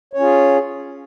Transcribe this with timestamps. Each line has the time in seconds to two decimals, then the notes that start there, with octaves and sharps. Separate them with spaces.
0.13 C#5
0.17 C#4
0.20 F4
0.23 G#4